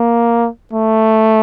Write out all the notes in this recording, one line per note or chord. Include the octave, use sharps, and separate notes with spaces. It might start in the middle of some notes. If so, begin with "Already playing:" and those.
Already playing: A#3
A3